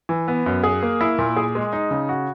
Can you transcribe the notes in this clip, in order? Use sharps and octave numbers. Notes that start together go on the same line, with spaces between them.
E3
B3
F#2
G#4
A#3
E4
A#2
G#4
G#3
D#4
C#3
F#4